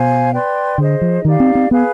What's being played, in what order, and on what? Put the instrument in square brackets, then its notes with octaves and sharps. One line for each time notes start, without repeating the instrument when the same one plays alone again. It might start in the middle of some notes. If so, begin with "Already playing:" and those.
Already playing: [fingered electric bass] B2 [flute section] C5 F5 G#5
[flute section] B4 D5 G5 C6
[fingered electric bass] D3 [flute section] G#4 C5 D#5
[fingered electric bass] F3
[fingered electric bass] D#3 [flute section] D#4 G4 D5 F5
[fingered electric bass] C4
C4
[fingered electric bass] B3 [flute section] G#4 B4 F5 G#5